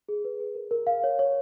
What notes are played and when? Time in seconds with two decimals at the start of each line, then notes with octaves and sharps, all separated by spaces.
0.09 G#4
0.25 B4
0.40 G#4
0.55 A#4
0.71 A#4
0.87 F5
1.04 C#5
1.19 C#5